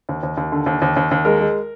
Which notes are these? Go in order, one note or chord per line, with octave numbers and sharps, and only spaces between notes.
D#2
D#2
D#2
D3
D#2
D#2
D#2
D#2
G#3 A#4
G#3